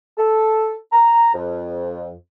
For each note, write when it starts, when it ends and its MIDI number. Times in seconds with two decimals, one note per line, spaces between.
0.18 0.72 69
0.92 1.34 82
1.34 2.13 41